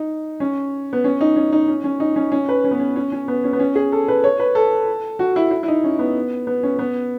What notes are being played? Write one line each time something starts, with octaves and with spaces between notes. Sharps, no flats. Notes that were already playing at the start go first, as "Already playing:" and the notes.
Already playing: D#4
C#4
B3
C#4
D#4
C#4
D#4
C#4
C#4
D#4
C#4
C#4
B4
C#4
B3
C#4
C#4
C#4
B3
C#4
B3
C#4
G#4
A4
B4
C#5
B4
A4
F#4
E4
E4
E4
D#4
C#4
B3
B3
C#4
B3